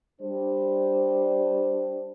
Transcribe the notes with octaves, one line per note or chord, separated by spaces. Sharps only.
G3 D4 C5